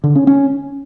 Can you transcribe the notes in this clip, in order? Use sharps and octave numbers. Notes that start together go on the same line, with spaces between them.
D3
C#4
C#4